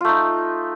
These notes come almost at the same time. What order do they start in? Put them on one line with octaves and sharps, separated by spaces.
F4 A3 D#4